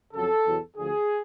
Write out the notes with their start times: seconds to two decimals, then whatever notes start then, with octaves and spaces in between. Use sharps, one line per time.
0.13 F2 C#3 F#3 A4
0.44 E2 B2 F#3
0.76 D2 D3 F3 G#4